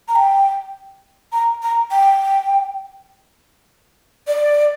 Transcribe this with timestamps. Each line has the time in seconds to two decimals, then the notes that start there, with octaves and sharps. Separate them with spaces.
0.08 A#5
0.15 G5
1.32 A#5
1.63 A#5
1.91 G5
4.27 D5